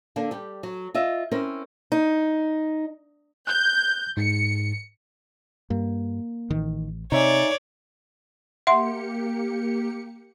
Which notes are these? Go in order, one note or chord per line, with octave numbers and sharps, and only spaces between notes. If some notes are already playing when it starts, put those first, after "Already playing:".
D3 A#3 D4
G3 G4
F#3
F4 D#5 E5
C4 C#4 E4 A#4
D#4
F#6 G6
G#2 C#7
G2 A#3
A1 D#3
C3 D#4 C#5 D5 E5 G#5
A#3 G4 E5 F#5 C6 C#7